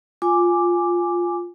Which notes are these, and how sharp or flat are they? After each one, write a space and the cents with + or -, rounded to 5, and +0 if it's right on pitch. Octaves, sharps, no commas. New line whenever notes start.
F4 +0 G#5 +0 D6 +0